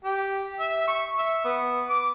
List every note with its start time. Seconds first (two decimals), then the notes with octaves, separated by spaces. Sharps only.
0.04 G4
0.59 E5
0.88 C#6
1.18 E5
1.44 B3
1.89 D6